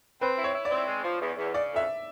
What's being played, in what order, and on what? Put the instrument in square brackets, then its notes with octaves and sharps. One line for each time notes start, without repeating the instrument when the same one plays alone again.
[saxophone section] C4 [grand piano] B4
[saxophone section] E4
[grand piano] C#5
[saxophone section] E4
[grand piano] D5
[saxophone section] C4
G#3
F3
E2
E2
[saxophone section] C#3 [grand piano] D5
[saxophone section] F2 [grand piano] E5